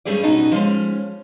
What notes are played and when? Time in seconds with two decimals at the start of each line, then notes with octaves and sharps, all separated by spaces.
0.05 G2 G3 A3 C#4 G#4 D5
0.23 B2 C#4 D#4 F#4 D#5 A5
0.52 F3 G#3 A3 C#4